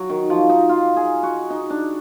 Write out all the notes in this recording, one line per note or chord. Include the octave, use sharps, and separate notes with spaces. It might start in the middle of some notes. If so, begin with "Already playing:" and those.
Already playing: F#3
D#3
F3
D#4
F4
G#4
F#4
D#4
D4